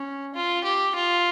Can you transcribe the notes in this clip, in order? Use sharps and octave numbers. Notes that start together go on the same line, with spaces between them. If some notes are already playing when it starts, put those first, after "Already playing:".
Already playing: C#4
F4
G4
F4